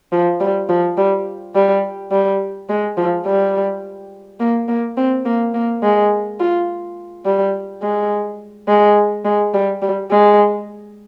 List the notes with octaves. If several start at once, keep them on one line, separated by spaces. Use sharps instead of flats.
F3
G3
F3
G3
G3
G3
G#3
F3
G3
A#3
A#3
C4
A#3
A#3
G#3
F4
G3
G#3
G#3
G#3
G3
G3
G#3